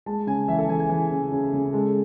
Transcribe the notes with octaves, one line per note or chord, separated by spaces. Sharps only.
G#3 A5
C#3 G#5
E3 E5
A4
E3 G#5
G#5
E3
C#3
C#3
C#3
G#3 A4